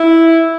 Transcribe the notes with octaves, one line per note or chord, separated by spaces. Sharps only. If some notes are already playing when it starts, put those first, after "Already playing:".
Already playing: E4